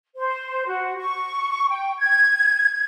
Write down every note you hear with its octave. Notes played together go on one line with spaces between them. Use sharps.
C5
F#4
C#6
G5
G#6